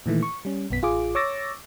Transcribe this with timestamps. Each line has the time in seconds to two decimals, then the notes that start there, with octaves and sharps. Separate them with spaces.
0.06 A#2 D#3 E3 A3
0.23 C#6
0.45 G3 C#4
0.70 B1 F#2 B3 B6
0.82 A1 F4 G#4 D6
1.15 C#5 C#6 D6 E6 A6 A#6